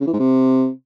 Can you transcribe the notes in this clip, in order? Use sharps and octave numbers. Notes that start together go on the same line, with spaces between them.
C#3
E3
G#2
C3